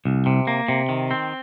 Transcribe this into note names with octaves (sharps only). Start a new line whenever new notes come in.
C2
C3
A#3
C3
D#3
C4